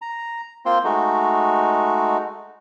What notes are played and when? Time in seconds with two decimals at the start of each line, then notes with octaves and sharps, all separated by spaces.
0.02 A#5
0.66 A#3 C4 F4 C5 G5 C6
0.84 G#3 A3 D#4 F#4